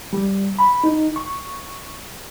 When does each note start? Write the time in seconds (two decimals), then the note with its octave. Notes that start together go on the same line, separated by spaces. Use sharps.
0.13 G3
0.59 B5
0.84 D#4
1.16 C#6